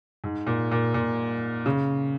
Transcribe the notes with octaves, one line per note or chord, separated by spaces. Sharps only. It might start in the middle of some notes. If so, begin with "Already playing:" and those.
G#2
A#2
A#2
A#2
C#3